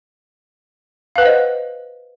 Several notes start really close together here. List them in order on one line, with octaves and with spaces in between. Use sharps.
F5 B4 F#5 C5 D#5